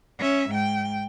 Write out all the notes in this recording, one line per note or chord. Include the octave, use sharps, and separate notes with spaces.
C#4 E5
G#2 G5